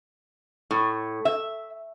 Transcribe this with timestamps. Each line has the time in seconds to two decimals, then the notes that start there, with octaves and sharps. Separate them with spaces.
0.71 A2
1.25 E5